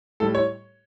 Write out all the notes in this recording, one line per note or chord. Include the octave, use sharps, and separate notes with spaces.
A2 G3 A4
C#5